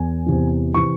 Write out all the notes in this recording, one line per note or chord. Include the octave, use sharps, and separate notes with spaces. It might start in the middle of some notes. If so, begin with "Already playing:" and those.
Already playing: E2 G#5
E2 C3 E3
C3 E3 C#6